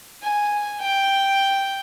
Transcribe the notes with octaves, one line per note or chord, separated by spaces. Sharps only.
G#5
G5